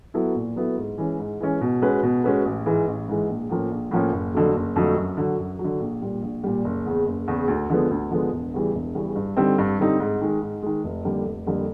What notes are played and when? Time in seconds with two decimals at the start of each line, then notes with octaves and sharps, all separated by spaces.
0.14 F#3 B3 E4 A4
0.35 A#2
0.56 F#3 B3 E4 A4
0.77 G#2
0.98 E3 G#3 C#4
1.19 G#2
1.40 E3 G#3 C#4
1.61 B2
1.82 G#3 C#4 F#4 B4
2.03 B2
2.24 G#3 C#4 F#4 B4
2.45 A1
2.66 G#2 E3 G#3
2.87 A1
3.09 G#2 E3 G#3
3.29 A#1
3.49 A2 F3 A#3 C#4
3.71 A#1
3.91 A2 F3 A#3 C#4
4.12 F#1
4.34 F2 D3 F#3 A3
4.55 F#1
4.76 F2 D3 F#3 A3
4.97 F#2
5.17 D3 F#3
5.39 F#2
5.59 F#3
5.64 D3
5.80 A#1
6.02 A#2 G3
6.23 A#1
6.44 A#2 G3
6.65 F#1
6.86 E2 C#3
7.06 F#1
7.28 E2 C#3
7.48 D2
7.70 D3 F3 G#3 B3
7.91 D2
8.11 D3 F3 G#3 B3
8.32 E1
8.54 E2 C#3 E3 G3
8.75 E1
8.95 E2 C#3 E3 G3
9.15 G2
9.37 D3 G3 C4 D#4
9.58 G2
9.79 D3 G3 C4 D#4
10.00 G#2
10.21 D#3 G#3
10.42 G#2
10.63 D#3 G#3
10.84 F1
11.05 F2 D3 G3 A#3
11.25 F1
11.47 F2 D3 G3 A#3